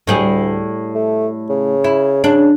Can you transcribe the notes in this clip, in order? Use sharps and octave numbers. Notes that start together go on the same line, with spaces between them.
D2 A2 G3 G#4
A3
C#3
E4
C#3 D4